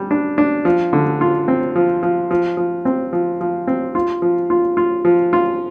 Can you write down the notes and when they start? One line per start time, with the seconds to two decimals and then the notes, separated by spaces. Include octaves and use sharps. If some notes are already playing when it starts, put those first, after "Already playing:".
Already playing: G3
0.11 D4
0.38 D4
0.65 F3
0.93 D3
1.21 F4
1.48 C4
1.76 F3
2.03 F3
2.31 F3
2.57 F3
2.85 C4
3.13 F3
3.41 F3
3.67 C4
3.95 F4
4.22 F3
4.50 F4
4.77 F4
5.05 F3
5.33 F4